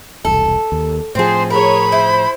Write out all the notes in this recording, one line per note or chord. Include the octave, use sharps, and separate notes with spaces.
E1 C2 A4
D#2
A2 F3 C4 G#4 C5
G#4 A#4 C#5 B5
E4 C5